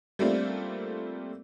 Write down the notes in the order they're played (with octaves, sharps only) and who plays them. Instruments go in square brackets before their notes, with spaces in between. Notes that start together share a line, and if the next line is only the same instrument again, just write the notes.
[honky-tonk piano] G3 A3 A#3 C4 D4 F4